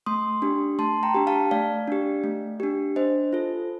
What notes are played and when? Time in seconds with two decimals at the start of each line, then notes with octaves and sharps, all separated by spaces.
0.06 A3 C6 D#6
0.42 D4 G4
0.79 A3 A5 C6
1.03 G5 A#5
1.14 D4 G4
1.27 F5 A5
1.51 A3 D5 F5
1.87 D4 G4
2.24 A3
2.60 D4 G4
2.96 D4 C5 D#5
3.33 F4 A4